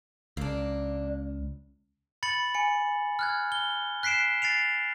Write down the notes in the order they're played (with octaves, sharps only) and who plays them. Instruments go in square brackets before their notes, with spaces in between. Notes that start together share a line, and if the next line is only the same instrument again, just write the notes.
[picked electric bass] C#2 [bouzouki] A#3 D4
[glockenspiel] B5 A6 C#7 F#7
G#5 C#7
F6 F#6 G#6
G7
F#6 B6 C7 D7 E7
A6 C7 D7 F7